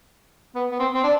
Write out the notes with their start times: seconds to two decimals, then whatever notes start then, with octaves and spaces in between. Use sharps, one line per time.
0.55 B3
0.71 B3
0.79 C4
0.95 C4
1.04 D4